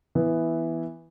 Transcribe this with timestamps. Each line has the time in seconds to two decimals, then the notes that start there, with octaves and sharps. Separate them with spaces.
0.15 E3 B3 E4